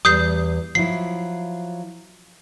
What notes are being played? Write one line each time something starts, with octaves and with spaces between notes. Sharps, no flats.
E2 G3 D#6 G6 C7
F3 F#3 E4 C7